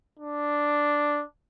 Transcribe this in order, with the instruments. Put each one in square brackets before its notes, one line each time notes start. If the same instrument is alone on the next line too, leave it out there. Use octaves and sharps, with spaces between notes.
[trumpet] D4